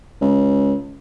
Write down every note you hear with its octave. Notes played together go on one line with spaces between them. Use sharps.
C#2